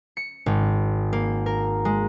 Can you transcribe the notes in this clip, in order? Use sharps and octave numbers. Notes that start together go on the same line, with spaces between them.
C#7
G#1
A#3
A#4
G#3